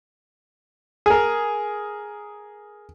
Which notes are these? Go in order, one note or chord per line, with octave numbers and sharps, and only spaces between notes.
G#4 A#4